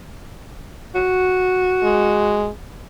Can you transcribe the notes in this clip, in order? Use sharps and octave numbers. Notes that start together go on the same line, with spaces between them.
F#4
G#3